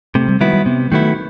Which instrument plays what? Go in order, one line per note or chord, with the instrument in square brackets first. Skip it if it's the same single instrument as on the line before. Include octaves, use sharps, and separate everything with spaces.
[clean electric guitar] C3 [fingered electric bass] A3
[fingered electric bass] G3
[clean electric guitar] D#3 F#3 B3 E4 [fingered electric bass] G3
[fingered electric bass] G3
[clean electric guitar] C3 [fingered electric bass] B3
[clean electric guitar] D#3 F#3 B3 E4 [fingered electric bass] A3